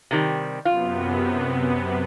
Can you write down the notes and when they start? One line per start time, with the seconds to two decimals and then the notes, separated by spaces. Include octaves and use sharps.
0.11 C3 D#3 G3
0.65 F#2 C3 B3 F4